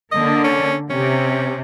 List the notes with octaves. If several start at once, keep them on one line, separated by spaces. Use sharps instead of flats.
D3 A#3 D#5
C#4
C3 C#4